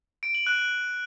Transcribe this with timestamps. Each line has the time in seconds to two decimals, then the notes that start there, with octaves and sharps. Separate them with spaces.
0.23 D7
0.35 F#7
0.47 F#6